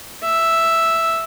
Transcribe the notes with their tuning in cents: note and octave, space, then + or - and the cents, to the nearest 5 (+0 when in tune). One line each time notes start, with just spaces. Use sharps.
E5 +0